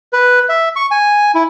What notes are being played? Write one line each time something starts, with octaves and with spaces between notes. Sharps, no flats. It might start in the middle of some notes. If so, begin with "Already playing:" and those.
B4
E5
C#6
G#5
E4